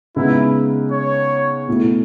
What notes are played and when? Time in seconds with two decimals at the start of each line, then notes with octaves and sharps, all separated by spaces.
0.16 C#3 G#3 B3 D#4 E4
0.92 C#5
1.68 B2 A3 E4